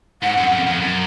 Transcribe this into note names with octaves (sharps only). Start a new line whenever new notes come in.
G#2 F#5
F#2
F2
F2
F#2